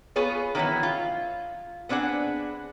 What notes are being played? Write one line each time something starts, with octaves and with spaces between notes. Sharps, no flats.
B3 F4 G#4 B4 C#5
D#3 E3 F#3 B3 E4
F4
B3 C4 D4 G#4 F#5